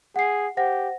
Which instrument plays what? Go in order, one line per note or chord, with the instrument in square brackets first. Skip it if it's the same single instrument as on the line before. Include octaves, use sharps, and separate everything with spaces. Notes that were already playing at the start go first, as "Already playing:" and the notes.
[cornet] G#4 [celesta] F#5 C7
[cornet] G4 [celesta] C5 F#5 A#6